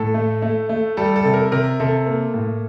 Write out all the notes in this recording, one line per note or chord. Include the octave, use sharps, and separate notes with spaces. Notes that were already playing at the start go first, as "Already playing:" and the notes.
Already playing: A2 A4
A3
A3
A3
G3 A4
A4
C3
A#4
C3 A#4
C3 A4
A#3
A2